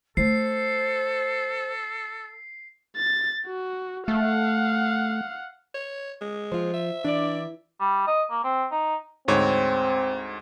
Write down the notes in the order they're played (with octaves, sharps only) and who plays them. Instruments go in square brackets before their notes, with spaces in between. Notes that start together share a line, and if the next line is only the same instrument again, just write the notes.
[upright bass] A3 [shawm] A4 [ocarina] C5 [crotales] C7
[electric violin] A6
F#4
[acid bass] A3 [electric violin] F5 F#5
[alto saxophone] C#5
G#3
[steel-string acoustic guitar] F3 F4 [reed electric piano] C5
[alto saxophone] E5
[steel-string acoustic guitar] E3 [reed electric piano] D4 [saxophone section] D5
[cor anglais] G3
D#5
A#3
C4
D#4
[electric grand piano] D2 G#2 C#5 [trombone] C4